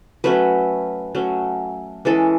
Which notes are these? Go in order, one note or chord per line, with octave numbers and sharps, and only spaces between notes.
F#3 A3 C#4 B4
F#3 A3 C#4
E3 G#3 C#4 A4